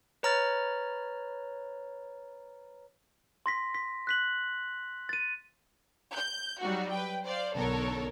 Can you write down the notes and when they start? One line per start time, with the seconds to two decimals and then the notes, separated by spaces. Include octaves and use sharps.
0.23 B4 C#5 A#5 B5 F6 A6
3.46 C6 A#6 B6
3.75 B6
4.07 F#6 B6 F#7
5.09 A6 D#7
6.14 G6
6.61 F#3 G3 D#4 F#4
6.91 B4 G5
7.25 C5 D5 F5
7.53 B1 D3 B3 A4 A#4 C#5